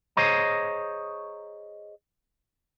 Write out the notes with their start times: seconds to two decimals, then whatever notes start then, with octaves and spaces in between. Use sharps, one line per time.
0.17 G#4 C5 C#5 D#5 A#5